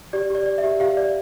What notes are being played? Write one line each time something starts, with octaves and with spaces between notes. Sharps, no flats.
G4 D5
G4 D5
D5
E5
G4
G4 F5
D5